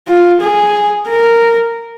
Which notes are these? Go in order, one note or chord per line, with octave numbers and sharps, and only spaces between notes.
F4
G#4
A#4